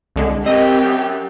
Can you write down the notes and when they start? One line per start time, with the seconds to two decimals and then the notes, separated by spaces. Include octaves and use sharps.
0.16 C2 D3 G#3
0.46 C4 G4 A#4 D#5
0.82 F#2